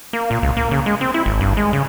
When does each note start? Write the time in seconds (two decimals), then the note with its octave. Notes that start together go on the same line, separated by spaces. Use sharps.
0.13 A#3
0.31 A#2
0.42 C#2
0.57 A#3
0.71 C#3
0.86 G#3
1.01 C4
1.14 E4
1.26 G#1
1.40 G2
1.57 G#3
1.73 C#3